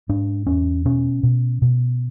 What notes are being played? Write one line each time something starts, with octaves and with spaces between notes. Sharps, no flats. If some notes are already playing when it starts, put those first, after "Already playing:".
G#2 D4
E2 C#4
B2 C#4
B2
B2